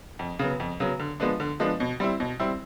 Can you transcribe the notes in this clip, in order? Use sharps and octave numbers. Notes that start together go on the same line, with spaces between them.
F2
C#3 F#3 B3
F2
C#3 F#3 B3
D3
F3 G#3 B3 D4
D3
F3 G#3 B3 D4
B2
G3 C4 E4
B2
G3 C4 E4